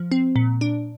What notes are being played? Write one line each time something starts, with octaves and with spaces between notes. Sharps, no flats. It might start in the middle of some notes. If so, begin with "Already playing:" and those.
Already playing: F3
C4
A#2
D4